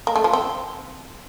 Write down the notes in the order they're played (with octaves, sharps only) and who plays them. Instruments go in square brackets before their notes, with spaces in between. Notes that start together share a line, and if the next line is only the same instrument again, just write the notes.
[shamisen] A#3
A3
F3
C4